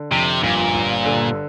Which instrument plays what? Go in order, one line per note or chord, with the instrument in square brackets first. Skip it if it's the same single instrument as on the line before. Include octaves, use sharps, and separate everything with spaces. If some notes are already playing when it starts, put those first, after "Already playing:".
Already playing: [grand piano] D3
[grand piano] F2 [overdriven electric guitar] C3
[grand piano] G1 [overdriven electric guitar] A#2
[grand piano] G1
D3